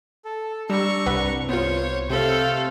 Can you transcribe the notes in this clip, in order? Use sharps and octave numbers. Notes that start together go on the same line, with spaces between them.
A4
G3 D4 A#5 C#6 E6
C2 G2 B4 F#5
B3 F4 C5 C#5
C3 A3 A4 C5 F5 G5